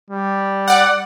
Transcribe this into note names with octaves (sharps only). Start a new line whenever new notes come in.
G3
D5 F#5